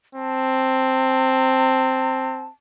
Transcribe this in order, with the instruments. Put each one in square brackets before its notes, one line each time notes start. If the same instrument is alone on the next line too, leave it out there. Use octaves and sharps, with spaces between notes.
[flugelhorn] C4 [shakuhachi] A5